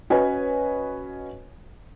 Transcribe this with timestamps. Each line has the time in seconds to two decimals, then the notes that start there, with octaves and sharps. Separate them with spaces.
0.10 C#4 F#4 B4 C#5 D#5 G#5